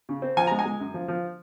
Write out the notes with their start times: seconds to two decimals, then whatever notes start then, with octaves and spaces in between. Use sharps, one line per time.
0.09 C#3
0.22 C4
0.37 F3 G#5
0.47 G#3 A#5
0.59 G#5
0.65 G#3
0.80 F#2
0.94 F3
1.08 F3